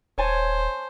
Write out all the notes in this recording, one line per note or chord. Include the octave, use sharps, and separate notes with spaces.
D#1 C5 C#5 G#5 A5